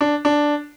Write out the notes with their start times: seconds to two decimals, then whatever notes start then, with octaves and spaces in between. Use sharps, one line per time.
0.01 D4
0.25 D4